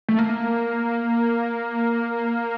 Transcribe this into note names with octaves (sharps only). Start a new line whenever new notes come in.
A3
A#3